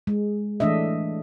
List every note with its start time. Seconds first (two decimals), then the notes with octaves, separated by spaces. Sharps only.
0.07 G#3
0.60 E3 A3 D4 D#5 E5